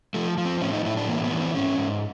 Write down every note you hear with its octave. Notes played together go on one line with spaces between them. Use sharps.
F3 A3
F3
C4
A2 C#4
D#4
A2 E4
D4
E3 A#3
B3
E3
C4
G#2 C#4
G#2